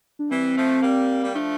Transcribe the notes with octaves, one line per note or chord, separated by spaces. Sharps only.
D4
E3 G3 C4
F3 A3
G3 A#3
G3
F3 A3 D4